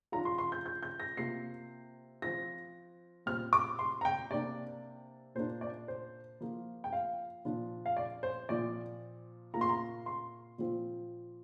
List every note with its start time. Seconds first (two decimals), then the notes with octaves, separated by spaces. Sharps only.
0.12 F3 D4 F4 A#5
0.25 C6
0.38 C6
0.52 G6
0.66 G6
0.83 G6
1.00 A#6
1.17 C3 A#3 F4 C7
2.22 F3 C4 F4 A#6
3.26 A#2 G3 C4 F6
3.53 D6
3.79 C6
4.01 A#5
4.05 G5
4.31 C3 A#3 D4 D5
5.35 A#2 A#3 D4 C5
5.61 D5
5.88 C5
6.41 F3 A#3 F4
6.84 G5
6.93 F5
7.45 A#2 F3 D4 F4
7.86 F5
7.97 D5
8.23 C5
8.49 A#2 F3 C4 F4 D5
9.54 A#2 A#3 F4 A#5
9.61 C6
9.69 A#5
10.06 C6
10.58 A#2 F3 C4 F4